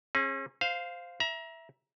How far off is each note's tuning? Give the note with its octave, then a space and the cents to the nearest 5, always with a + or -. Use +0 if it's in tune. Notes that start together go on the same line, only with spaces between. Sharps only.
C#4 -40 G#4 +0
C5 -10 F5 +0
E5 +0 A#5 +30